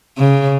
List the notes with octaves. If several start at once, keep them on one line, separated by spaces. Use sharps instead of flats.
C#3